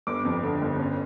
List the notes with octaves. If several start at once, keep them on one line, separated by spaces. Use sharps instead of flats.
G1 D6
F2
D3
G1
C#4